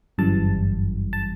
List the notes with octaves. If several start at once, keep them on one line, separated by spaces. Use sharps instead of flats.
G1 F#2 E3 G3 A5
A5